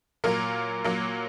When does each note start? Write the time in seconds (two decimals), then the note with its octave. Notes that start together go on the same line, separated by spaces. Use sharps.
0.24 A#2 F#3 A#3 A#4
0.84 A#2 F#3 A#3